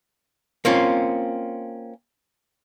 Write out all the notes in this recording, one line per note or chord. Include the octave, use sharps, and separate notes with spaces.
A#3 C4 C#4 F4